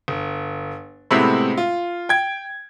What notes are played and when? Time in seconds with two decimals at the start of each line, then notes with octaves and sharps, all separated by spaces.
0.08 G1
1.11 A2 C3 G#3 B3 C4 E4
1.57 F4
2.09 G5 G#6